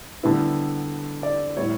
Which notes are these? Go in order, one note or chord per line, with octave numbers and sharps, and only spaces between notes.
D3 G3 B3 E4
D5
A2 G3 B3 E4 C#5